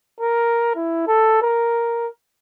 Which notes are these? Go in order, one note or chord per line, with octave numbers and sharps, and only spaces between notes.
A#4
E4
A4
A#4